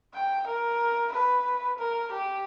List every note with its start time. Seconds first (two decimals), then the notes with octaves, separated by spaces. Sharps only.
0.14 G5
0.47 A#4
1.12 B4
1.79 A#4
2.12 G4